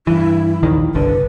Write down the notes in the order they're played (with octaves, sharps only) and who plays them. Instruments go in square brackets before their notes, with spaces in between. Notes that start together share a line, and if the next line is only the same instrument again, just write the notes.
[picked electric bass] G2 E3 [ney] E4
[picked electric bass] A#1 D#2 D#3
[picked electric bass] G1 C2 D3 [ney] B4